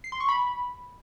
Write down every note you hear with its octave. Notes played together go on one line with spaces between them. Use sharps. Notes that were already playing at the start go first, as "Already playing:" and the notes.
C7
C6
C#6
B5